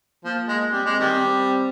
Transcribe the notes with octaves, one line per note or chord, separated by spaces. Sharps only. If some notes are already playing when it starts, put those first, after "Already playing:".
F3 A#3
G#3
G3 C4
G#3
D#3 G3
C4